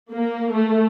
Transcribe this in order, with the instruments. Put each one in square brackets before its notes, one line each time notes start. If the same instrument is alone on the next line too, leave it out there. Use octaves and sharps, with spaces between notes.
[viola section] A#3
A3